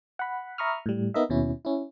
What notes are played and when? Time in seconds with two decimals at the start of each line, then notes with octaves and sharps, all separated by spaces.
0.19 F#5 B5
0.58 E5 A#5 B5 C#6 D#6 F6
0.86 A2 G3
1.14 B3 D#4 A#4 D#5 E5
1.30 D#2 B2 C#4 E4
1.65 C#4 E4